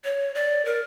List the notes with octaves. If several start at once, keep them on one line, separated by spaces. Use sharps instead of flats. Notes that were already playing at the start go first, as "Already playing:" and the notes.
C#5
D5
A#4